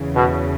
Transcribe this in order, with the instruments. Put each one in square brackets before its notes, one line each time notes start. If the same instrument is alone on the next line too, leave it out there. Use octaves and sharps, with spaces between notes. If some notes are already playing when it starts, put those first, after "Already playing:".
Already playing: [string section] E2 C#3 E3
[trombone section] B2